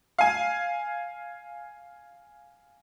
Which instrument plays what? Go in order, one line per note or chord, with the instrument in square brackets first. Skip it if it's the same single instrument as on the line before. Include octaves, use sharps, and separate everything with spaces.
[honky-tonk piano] F5 G#5